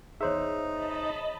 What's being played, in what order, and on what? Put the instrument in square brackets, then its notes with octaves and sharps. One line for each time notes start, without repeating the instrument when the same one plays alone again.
[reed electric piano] E2 C5 E5 [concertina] D#4 [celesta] G#4 C#5
[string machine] D#5 A5 B5